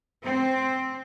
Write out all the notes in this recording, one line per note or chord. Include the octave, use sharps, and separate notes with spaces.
C4